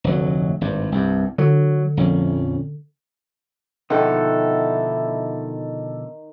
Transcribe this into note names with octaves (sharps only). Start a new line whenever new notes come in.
F1 D2 F#3
G#1 G2
C2 G2
D3 F#3
A#1 F2 C#4
B2 D3 D#3 F3 E4 A4 F#5